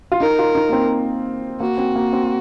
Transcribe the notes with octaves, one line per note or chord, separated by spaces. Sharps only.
F4
D#4 A#4
F4
D#4
A#3
C4
A#3 F#4
C4
A#3
C4